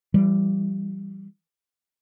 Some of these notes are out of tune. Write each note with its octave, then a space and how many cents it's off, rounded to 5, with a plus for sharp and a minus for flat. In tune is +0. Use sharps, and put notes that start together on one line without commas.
E3 +40 G3 +0